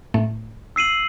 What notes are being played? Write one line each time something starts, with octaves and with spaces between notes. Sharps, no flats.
A2 A3
E6 C7 D#7 F#7